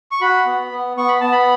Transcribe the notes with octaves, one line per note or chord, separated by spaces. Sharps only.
C#6
F#4 B5
B3
B3
B3 C#6
B5
B3 A5
B5